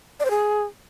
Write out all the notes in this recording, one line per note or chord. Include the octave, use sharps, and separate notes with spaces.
D5
C5
G#4